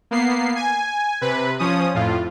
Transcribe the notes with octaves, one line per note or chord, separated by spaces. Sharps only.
A#3 B3 C7
G#5
C3 B4
F3 C#4 D#6
F2 A2 F4